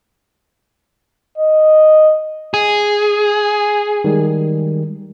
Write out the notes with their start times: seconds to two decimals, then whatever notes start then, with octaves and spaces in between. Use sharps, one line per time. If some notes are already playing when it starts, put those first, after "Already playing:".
1.38 D#5
2.54 G#4
4.04 D#3 G3 G#3